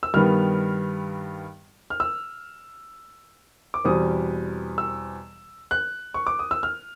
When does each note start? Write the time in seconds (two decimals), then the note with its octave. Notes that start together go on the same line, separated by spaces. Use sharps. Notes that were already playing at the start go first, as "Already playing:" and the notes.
0.03 E6
0.14 G2 D#3 G3 B3 F6
1.90 F6
2.00 E6
3.74 D6
3.84 E2 B2 G3 C4 D#6
4.78 E6
5.71 F#6
6.14 C#6
6.27 D6
6.39 D#6
6.51 E6
6.63 F6